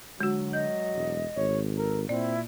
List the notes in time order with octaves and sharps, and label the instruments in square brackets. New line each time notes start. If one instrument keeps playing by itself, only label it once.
[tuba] D3 [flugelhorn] F#3 [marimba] G#3 F#4
[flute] D#5 [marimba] G6
[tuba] E1
[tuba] G#1 [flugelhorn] C#5
[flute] A4 [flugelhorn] A#4
[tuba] A#2 [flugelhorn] C4 [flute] E4 [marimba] D5